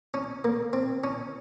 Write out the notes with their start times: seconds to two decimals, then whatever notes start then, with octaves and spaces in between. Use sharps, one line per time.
0.14 C#4
0.44 A#3
0.73 C4
1.04 C#4